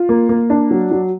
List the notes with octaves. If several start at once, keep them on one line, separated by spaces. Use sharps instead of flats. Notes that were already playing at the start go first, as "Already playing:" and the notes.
Already playing: F4
A#3
A#3
D4
F#3
F#3